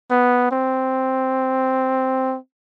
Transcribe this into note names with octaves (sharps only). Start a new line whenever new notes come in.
B3
C4